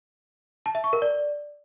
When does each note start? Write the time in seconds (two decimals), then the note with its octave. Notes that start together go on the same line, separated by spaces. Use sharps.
0.66 A5
0.75 E5
0.84 C#6
0.93 A#4
1.02 D5